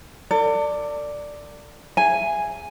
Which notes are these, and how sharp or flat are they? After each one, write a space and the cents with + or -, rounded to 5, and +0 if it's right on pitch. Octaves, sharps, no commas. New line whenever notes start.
A4 +45 D5 +0
G#4 -5 E5 +30 G#5 +0